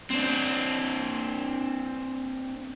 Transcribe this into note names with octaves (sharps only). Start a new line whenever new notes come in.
C4 D4